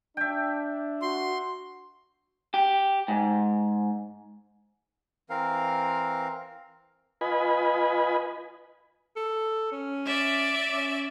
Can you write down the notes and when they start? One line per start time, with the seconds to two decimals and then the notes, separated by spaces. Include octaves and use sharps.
0.17 D4 E5 G5
1.02 F#4 C6
2.54 G4
3.08 G#2
5.30 E3 C4 A#4 F5
7.21 F4 B4 D#5 G#5 B5
9.16 A4
9.72 C#4
10.05 D5 E5 D6
10.72 C#4